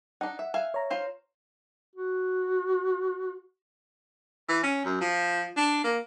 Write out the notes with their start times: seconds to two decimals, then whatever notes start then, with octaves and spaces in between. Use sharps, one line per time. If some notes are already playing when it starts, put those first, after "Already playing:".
0.21 D4 D#4 F#5
0.39 E5
0.54 E5 F5 G#5
0.74 C#5 A#5
0.90 F4 C5 F5
1.96 F#4
4.49 E3
4.63 C#4
4.85 F#2
5.01 F3
5.57 D4
5.84 A#3